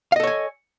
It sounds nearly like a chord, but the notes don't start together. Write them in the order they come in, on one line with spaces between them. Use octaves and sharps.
F5 D#5 A4 C#5 G#5